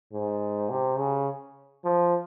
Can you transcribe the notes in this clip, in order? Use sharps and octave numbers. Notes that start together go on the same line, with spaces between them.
G#2
C3
C#3
F3